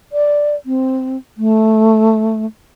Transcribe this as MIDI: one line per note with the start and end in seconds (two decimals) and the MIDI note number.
0.13 0.56 74
0.66 1.17 60
1.38 2.46 57